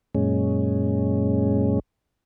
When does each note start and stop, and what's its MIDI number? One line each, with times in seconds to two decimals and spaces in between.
0.15 1.79 42
0.15 1.79 46
0.15 1.79 56
0.15 1.79 61